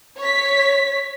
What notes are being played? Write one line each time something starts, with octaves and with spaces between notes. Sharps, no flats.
C#5 B6